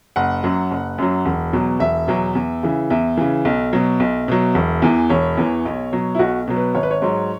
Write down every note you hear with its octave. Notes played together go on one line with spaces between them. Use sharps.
F#1 F#5
F#2 F#3
F#1
F#2 F#3
E1
E2 B2 F#3
E1 E5
E2 B2 F#3
E2
C#3 E3
E2 E5
C#3 E3
B1
B2 F#3
B1
B2 F#3
E1
E2 E3
E1 C#5
E2 E3
B1
B2 F#3
E4
B1 F#4
B2 F#3
B4
G#1 C#5
B4
C#5
G#2 F#3